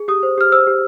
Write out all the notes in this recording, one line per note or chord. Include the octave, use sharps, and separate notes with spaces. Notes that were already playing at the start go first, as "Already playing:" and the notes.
Already playing: G#4
G4 D#6
C5
G4 F6
C5 E6
G4